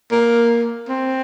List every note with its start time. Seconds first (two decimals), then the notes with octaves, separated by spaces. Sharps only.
0.11 A#3
0.88 C4